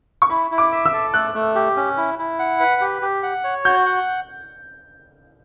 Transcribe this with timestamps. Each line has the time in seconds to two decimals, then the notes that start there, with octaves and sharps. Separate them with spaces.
0.22 C#6
0.29 E4 B5
0.51 E4
0.58 D6
0.72 E5
0.86 E6
0.93 A4
1.14 A3 F#6
1.35 A3
1.55 G4
1.76 C#4
1.97 E4
2.19 E4
2.39 F#5
2.60 B4
2.81 G4
3.02 G4
3.23 F#5
3.44 C#5
3.65 F#4 G6
3.86 F#5